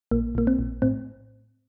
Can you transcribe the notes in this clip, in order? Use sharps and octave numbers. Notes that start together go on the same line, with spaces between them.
A#1 A#3
A#1 A#3
C4
A#1
A2 C4